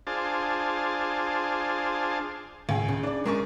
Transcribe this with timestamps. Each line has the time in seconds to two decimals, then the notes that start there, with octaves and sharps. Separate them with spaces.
0.07 D4 F4 G#4 C5 A5
2.69 C#2 A2 G#4
2.89 C#3
3.03 D4 D5
3.26 G#3 A3 C#4 A#4 C#6